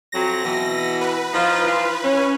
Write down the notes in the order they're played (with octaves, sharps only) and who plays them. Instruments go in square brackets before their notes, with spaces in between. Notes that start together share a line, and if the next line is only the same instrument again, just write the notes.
[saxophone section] F2 F#3 [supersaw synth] A#6
[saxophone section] B2 E3
[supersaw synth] B4
[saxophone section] F3 D#4 F4
E3 F4
C#4